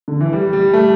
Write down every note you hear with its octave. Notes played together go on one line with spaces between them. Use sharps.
D3
E3
G3
G3
A3